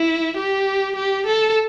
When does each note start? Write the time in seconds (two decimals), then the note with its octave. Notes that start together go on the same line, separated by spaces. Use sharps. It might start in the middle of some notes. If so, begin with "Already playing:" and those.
Already playing: E4
0.37 G4
0.95 G4
1.26 A4